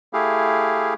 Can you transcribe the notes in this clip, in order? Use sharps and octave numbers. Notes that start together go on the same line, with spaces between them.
A3 E4 G4 G#4 F5